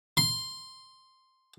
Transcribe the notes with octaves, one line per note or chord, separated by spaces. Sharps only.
C6